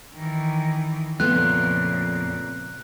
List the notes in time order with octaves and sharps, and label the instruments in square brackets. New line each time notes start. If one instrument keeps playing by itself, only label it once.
[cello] D#3 E3
[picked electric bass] F2 [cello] A#2 C#3 [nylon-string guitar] A3 B3 F4 [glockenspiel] F#6